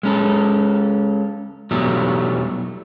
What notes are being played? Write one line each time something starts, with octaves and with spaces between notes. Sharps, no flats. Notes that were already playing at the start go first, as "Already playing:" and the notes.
G#3 C#4 A4
B2 E3 F#3 G3 A3